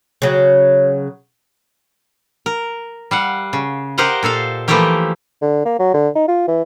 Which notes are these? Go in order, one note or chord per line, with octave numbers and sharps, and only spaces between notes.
C#3 F#3
A#4
G3 F5 F#5
C#3
G4 A#4 C5 D#5 F5 F#5
A#2 A4 C5 F5
E3 F3 A3 A#3 G4 A#4
D3
A#3
F#3
D3
D#4
F4
E3